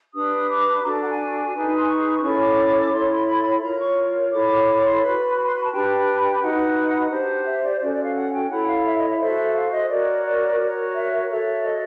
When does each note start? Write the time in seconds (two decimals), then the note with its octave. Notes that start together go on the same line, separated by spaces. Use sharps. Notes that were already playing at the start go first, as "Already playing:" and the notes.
0.14 D4 G4 B4 D#6
0.49 D6
0.83 D4 F#4 A4 A#5
0.92 A5
1.00 F#5
1.09 G#5
1.53 D#4 G#4 B4
1.78 C6
1.88 C#6
2.22 C#4 E4 A4 C#5 C#6
2.40 D6
2.58 D6
2.92 E4 A4 C#5 C6
3.10 C6
3.27 B5
3.62 F4 A#4 C#5 A#5
3.80 C#6
4.32 E4 A4 C#5 D6
4.66 D6
4.77 B5
4.84 C6
5.02 F#4 B4 B5
5.36 B5
5.45 C6
5.54 B5
5.63 A5
5.71 D4 G4 B4 G5
6.41 D#4 F#4 B4 F#5
7.10 D4 G4 C5 F#5
7.46 E5
7.63 D5
7.80 C#4 F#4 A4 D5
7.92 D5
8.04 F5
8.15 F#5
8.33 G5
8.50 E4 A4 C#5 F#5
8.68 F5
8.85 E5
8.96 D#5
9.08 E5
9.20 F#4 A4 C5 E5
9.54 F5
9.72 D#5
9.89 F#4 A#4 C#5 D5
10.24 D5
10.59 F#4 A#4 C#5
10.94 E5
11.29 F#4 A4 C#5 E5
11.64 D#5